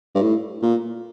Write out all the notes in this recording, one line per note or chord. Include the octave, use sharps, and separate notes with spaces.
G2
A2
A#2